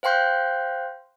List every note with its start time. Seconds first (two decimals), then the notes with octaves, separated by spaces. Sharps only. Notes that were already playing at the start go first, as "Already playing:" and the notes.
0.03 C5 F5 G5 C6 F#6 G6